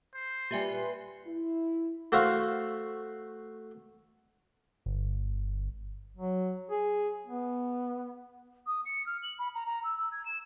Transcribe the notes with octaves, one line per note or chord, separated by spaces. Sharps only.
C5
A#2 G3 G4 B4 E5 G#5 C6
E4
A3 F#4 C5 F5
G1
F#3
G#4
B3
D#6
C#7
F6
F#7
B5
A#5
A#5
E6
E6
G#6
E7